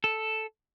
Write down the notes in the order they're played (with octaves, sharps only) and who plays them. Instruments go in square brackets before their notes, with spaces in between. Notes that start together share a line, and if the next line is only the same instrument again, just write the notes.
[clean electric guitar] A4